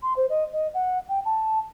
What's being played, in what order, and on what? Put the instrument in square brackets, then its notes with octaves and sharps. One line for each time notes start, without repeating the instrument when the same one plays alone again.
[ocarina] C6
C5
D#5
D#5
F#5
G5
A5